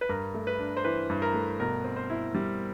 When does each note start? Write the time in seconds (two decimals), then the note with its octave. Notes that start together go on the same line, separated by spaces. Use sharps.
0.01 B4
0.09 G2 A#4
0.34 A3
0.47 B4
0.59 D4
0.77 C5
0.84 E3 B4
1.10 G2
1.22 A#4
1.34 A3
1.60 B2 A#4
1.84 C4
1.96 C5
2.10 E4
2.35 G3